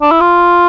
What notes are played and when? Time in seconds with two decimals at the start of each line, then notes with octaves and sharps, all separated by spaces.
0.02 D4
0.11 E4
0.21 F4